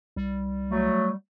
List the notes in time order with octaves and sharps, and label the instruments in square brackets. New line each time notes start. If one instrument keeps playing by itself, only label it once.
[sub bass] C2 [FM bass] G3
[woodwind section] F#3 A3